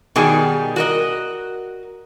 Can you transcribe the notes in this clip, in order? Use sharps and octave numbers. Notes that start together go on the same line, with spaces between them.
B2 D#3 G3 G#4
F#4 A#4 D#5